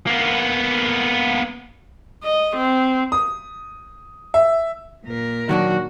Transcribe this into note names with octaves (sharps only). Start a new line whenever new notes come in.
A#3 B3
D#5
C4
D#6
E5
A#2 A#4
D#3 F#3 D4 F#4